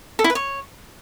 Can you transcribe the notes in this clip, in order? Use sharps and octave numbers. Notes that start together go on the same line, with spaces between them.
A4
E4
B4
C#5